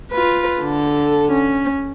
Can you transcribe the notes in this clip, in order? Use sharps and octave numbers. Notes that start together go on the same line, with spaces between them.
F4 B4
D3 A4
C#4